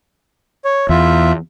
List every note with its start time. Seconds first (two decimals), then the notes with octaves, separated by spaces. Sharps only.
0.65 C#5
0.89 E2 F4 E5